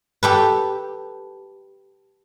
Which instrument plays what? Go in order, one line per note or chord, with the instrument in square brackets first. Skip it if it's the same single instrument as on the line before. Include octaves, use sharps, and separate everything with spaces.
[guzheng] G4 A4 B4